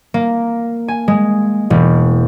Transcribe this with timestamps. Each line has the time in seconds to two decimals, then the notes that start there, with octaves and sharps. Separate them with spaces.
0.14 A#3
0.88 G#5
1.08 G#3
1.70 E1